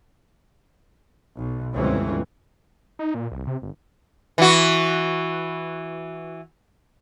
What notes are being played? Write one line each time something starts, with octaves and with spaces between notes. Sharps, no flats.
B1
G1 C#2 E3 F3 C4 C#4
D#4
A#2
C2
C3
G1
E3 F#4